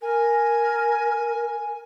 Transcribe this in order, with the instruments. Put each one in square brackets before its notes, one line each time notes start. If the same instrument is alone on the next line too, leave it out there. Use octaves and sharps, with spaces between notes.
[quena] A#4 [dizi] G#5